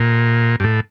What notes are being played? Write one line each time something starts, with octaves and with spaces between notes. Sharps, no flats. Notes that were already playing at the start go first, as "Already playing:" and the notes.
Already playing: A#2
G2
A2